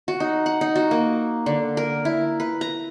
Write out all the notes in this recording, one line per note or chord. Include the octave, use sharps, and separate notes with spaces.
F#4
D#4
F#5
D#4
F#4
A#3
D3
A#4
E4
B4
A#5